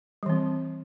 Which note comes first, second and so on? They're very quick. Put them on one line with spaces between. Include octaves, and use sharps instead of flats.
G3 E3 C4